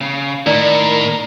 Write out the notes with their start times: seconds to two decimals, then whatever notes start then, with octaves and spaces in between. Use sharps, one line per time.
0.01 C#3
0.47 A2 D#3 A#4 D5